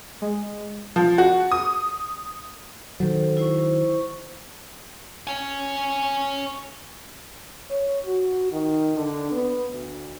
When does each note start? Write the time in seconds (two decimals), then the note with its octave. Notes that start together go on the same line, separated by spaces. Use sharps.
0.22 G#3
0.96 F3
1.18 F#4
1.52 D#6
3.00 D#3 F#3 A4 C5
3.37 E4 C5 C#6
5.27 C#5 G#5
7.70 C#5
8.05 F#4
8.52 D#3
8.96 D3
9.32 B3
9.71 D2